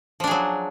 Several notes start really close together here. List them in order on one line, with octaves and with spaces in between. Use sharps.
F3 D4 G#4 F#3